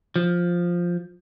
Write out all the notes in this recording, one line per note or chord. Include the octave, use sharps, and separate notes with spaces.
F3